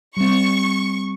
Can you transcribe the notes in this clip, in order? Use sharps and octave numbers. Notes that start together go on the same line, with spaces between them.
G3 C4 C#6